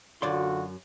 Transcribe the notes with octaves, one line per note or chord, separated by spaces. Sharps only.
F#2 D3 F4 F#4 D5 C6